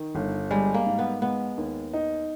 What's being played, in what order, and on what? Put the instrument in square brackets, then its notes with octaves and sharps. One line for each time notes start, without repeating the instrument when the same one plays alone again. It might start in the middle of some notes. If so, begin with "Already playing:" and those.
Already playing: [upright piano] D#3
G1
[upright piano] G3 [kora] G#3
[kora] A#3
[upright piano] G#2
[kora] B3
[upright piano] G#3 [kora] B3
[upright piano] D#2
D#4